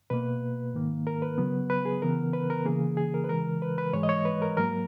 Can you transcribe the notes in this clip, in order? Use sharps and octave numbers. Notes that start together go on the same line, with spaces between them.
B2 A#3 B4
G#2 D#3 A#3
A#4
B4
C#3 F#3 B3
B4
G#4
C#3 E3 B3 A#4
B4
A#4
C#3 E3 A#3 G#4
G#4
A#4
B4
C#3 E3 G#3 A#4
B4
B4
G#2 E3 G#3 C#5
D#5
C#5
B4
A#4
G#2 F#3 A#3 A#4